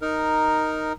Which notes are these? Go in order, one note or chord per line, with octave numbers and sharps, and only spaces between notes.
D#4 A#4